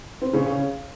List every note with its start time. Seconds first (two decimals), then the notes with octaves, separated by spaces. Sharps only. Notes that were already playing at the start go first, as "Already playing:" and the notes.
0.22 C4
0.33 C#3 C#4
0.46 C#3 C#4